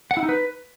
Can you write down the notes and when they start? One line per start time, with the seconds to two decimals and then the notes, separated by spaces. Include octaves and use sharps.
0.11 F#5
0.17 E4
0.23 D#4
0.29 B4